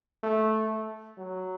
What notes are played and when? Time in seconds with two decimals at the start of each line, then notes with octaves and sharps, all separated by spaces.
0.23 A3
1.18 F#3